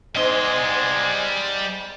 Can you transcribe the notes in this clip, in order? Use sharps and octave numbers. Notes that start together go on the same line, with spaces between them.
G#2 G3 G#3 B3 D#5 C6